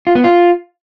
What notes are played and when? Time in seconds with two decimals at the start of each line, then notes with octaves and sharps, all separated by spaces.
0.07 F4
0.15 B3
0.24 F4